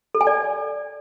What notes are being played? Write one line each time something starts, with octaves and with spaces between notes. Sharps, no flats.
A4
G#5
D5